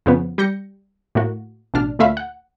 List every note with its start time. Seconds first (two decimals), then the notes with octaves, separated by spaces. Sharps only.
0.06 F2 C#3 F3 B3
0.38 G3 G6 A#6 C#7
1.15 A2 A#3 F#4
1.74 A1 B2 D4 F6
1.99 D2 A#2 A3 E5 F5 B5
2.17 F#5